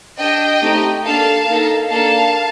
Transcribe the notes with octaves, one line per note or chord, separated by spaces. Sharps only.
D4 G4 D#5 G5
A3 C4 D#4 G4
A#3 D4 A4 F5 A5
A#3 D#4 A4
A#3 D4 A4 F5 A5